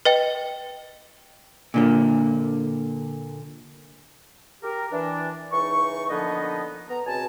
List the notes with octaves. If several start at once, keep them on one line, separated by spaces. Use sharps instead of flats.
B4 D#5 G5
A#2 D3 A#3
G4 A#4
E3 D4
C#2 E3 D#4 C#6
A#2 D3 F3 B3 D#4 D#5
B3 A#5
C#2 B2 C4 G#5 A5